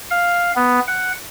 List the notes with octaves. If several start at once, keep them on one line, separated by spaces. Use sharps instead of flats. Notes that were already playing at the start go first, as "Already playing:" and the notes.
F5
B3
F#5